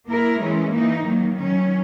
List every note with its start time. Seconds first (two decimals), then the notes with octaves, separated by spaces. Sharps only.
0.09 A#3 E4 A#4
0.41 E3 G#3 C#4
0.74 E3 A#3 D#4
1.06 D#3 F#3 A#3
1.38 D#3 F#3 C#4